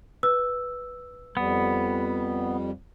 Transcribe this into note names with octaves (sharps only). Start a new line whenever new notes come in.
B4 E6
F2 G3 B3